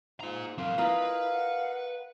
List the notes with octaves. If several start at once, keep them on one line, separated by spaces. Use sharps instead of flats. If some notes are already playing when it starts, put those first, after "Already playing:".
G#2 F4 A#5
F#3 C4 A#4 F5
E4 F4 A#4 B4 D#5
F#5